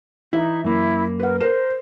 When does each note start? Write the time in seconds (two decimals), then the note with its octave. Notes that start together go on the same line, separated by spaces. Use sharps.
0.33 E3 D#4 E4 E5
0.64 F#2 A#3 E4
1.20 A#4 B4 F#5
1.41 A#4 C5 C7 E7